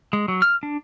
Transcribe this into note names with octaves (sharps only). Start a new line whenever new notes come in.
G#3
F#3
F6
D4